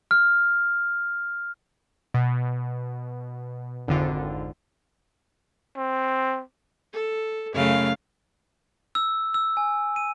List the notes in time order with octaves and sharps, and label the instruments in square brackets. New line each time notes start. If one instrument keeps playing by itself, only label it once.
[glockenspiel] F6
[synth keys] B2
G#1 F2 D3 F4
[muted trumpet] C4
[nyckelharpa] A4
[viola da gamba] F#2 C#3 A3 [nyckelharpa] F5
[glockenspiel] E6
E6
G#5
D#7